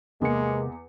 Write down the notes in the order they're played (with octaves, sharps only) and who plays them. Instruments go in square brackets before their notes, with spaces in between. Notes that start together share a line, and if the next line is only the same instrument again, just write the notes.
[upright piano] E2 G#4 C#7 [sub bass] C3 [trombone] G#3 [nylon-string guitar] A#3